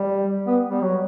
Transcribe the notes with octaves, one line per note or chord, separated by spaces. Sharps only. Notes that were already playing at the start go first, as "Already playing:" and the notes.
Already playing: G3
B3
G3
F#3